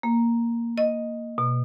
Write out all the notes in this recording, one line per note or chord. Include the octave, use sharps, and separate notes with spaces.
A#3
D#5
B2